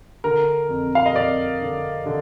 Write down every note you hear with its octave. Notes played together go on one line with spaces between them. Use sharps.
D3 A#4
F2
F5
D#5
F2 D5
D3
D3